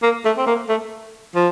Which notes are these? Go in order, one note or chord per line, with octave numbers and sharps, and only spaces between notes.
A#3
A3
C4
A#3
A3
F3